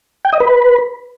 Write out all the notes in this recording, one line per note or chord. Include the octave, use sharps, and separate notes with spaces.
G5
D#5
B4